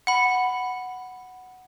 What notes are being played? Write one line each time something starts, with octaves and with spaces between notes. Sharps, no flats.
F#5 B5